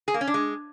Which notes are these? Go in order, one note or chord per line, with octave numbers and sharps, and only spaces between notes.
G#4
A#3
C#4
D4
G#3